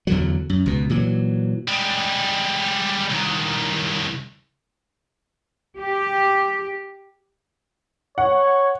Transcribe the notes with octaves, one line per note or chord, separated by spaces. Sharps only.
E2 D3 F#3
F#2
C#2 B2
A#2 E3 F#3
G3 G#3
C2 D#3
G4
C#5 F#5